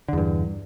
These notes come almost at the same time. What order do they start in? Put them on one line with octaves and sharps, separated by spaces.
D3 E2 G2